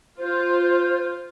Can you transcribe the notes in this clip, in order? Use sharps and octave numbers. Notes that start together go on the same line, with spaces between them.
F4 C5